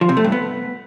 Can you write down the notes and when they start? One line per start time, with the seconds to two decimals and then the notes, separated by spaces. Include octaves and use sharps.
0.01 F3
0.09 C3
0.17 A3
0.24 G2
0.32 B3